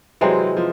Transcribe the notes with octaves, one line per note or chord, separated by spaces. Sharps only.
C3 E3 F#3 G#3 C4
F3